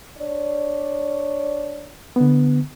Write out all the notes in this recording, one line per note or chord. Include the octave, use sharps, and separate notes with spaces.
D4 C#5 D5
D3 B3